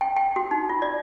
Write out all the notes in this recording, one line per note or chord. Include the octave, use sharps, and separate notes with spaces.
G5
G5
F#4
D#4
F4
D5